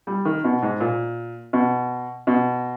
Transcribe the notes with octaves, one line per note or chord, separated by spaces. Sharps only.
G3
D#3
B2
G#2
A#2
B2
B2